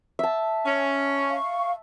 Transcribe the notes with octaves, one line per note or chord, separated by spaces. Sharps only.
E5 A5
C#4
F5 C#6